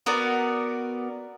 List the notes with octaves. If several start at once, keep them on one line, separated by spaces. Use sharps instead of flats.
B3 F#4 A#4 D5